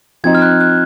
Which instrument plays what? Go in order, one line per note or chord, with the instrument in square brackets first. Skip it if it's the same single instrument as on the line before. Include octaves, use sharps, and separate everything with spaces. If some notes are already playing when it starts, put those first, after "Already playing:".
[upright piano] F3 C4 D#4 [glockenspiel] G#6
[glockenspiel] F6
F#6
F#6